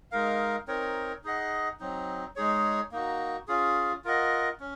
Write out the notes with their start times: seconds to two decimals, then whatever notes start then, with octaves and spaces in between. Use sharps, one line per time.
0.11 G#3 D#4 A#4 F5
0.67 C4 D#4 A#4 C#5
1.24 D#4 G#4 D#5 F#5
1.80 F#3 C4 D#4
2.36 G#3 D#4 G#4 C#5
2.92 A#3 D#4 F#4
3.47 C#4 F4 G#4
4.04 F4 A#4 D#5 F#5
4.60 C#4